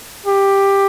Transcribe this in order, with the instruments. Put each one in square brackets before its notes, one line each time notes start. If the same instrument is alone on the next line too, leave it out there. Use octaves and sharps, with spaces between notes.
[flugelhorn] G4